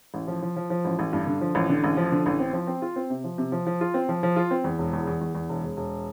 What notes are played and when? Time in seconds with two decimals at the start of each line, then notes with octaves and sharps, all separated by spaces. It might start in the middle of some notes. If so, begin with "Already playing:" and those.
0.14 A1
0.28 F3
0.42 F3
0.56 F3
0.70 F3
0.85 A1
0.99 A1
1.13 G2
1.26 D3
1.41 F3
1.55 A1
1.69 D3
1.84 A1
1.97 F3
2.12 D3
2.26 A1
2.39 C4
2.53 F3
2.67 C4
2.82 F4
2.96 C4
3.10 C3
3.24 F3
3.38 C3
3.52 F3
3.67 F3
3.81 F4
3.94 C4
4.09 F3
4.23 F3
4.36 F4
4.51 C4
4.64 E2
4.78 E1
4.93 E2
5.07 E2
5.21 E2
5.35 E2
5.49 E1
5.63 E1
5.77 E1